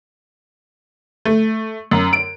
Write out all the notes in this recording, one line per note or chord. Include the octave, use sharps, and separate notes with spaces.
A3
F#2
D7